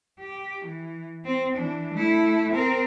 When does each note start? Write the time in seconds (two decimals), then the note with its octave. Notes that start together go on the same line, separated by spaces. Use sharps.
0.20 G4
0.65 E3
1.25 C4
1.56 E3 D4
1.94 A3 E4
2.52 C4 A#4